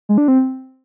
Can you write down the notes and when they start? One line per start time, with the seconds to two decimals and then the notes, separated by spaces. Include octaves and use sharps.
0.09 G#3
0.18 D4
0.28 C4